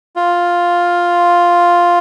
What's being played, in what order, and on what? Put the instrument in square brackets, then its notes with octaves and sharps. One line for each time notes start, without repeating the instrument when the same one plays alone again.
[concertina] F4